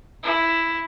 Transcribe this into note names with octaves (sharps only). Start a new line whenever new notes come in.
E4